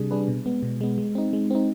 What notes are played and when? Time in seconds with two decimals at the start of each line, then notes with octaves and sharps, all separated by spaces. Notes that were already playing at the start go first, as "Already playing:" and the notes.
Already playing: C3 G3 D4 G#4
0.11 G3 D4 G#4 B4
0.28 B2
0.46 G#3 B3
0.63 B2
0.81 G#3 B3
0.98 G#3
1.15 C4 D#4
1.33 G#3
1.50 C4 D#4